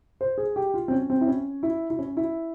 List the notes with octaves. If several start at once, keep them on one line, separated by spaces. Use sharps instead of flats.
C5
G#4
G4
F4
C4
C#4
C4
E4
C#4
E4
E4
C#4
E4